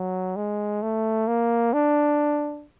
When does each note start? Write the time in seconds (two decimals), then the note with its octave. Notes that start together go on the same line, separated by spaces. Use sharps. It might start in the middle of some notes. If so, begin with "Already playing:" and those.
Already playing: F#3
0.36 G#3
0.82 A3
1.27 A#3
1.73 D4